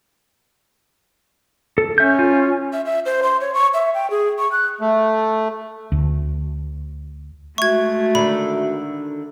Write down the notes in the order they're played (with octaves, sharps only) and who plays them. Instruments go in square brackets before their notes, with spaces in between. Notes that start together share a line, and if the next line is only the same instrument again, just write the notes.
[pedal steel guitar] A4
[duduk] C#4 [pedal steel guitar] E5 G6
[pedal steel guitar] F4
[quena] E5
E5
C5
C6
C#5
C#6
E5
G5
G#4
C#6
F#6
[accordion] A3
[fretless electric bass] D2
[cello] G#3 A3 [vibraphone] F#4 E5 [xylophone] C#6 G#6
[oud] D3 D#3 [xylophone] B5